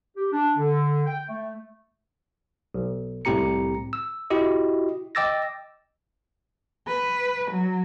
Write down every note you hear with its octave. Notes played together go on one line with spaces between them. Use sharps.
G4
D4
D3
G5
A3
B1
C2 A2 C4 G4 A#5 C#7
E6
E4 F#4 G4 D#5
D#5 G5 D6 E6 A6 A#6
B4
F#3